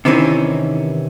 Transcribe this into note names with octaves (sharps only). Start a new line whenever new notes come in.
C3 D#3 E3 C4 C#4